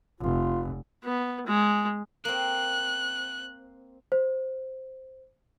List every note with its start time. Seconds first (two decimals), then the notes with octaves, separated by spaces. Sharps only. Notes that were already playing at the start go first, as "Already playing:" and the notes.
0.21 F1 F4
1.03 B3
1.46 G#3
2.25 A#3 C4 F#6
4.12 C5